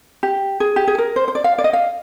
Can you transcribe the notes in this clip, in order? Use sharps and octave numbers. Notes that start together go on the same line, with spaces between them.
G4
G#4
G4
G#4
A#4
C5
C5
D5
F5
D5
D#5
F5